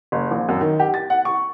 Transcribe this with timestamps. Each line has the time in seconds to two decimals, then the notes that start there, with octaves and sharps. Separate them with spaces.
0.12 F#1
0.31 A#1
0.49 F#2
0.61 D#3
0.80 G4
0.94 A6
1.10 F#5
1.25 C#6